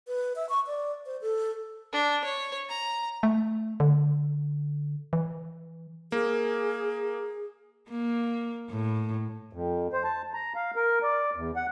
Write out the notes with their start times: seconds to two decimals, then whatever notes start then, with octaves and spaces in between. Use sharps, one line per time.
0.08 B4
0.36 E5
0.49 C#6
0.67 D5
1.06 C5
1.21 A4
1.93 D4
2.24 C#5
2.69 A#5
3.23 A3
3.80 D3
5.13 E3
6.12 A#3 G#4
7.89 A#3
8.70 A2
9.53 F2
9.93 C5
10.04 A5
10.34 A#5
10.55 F5
10.76 A#4
11.03 D5
11.36 E2
11.56 F#5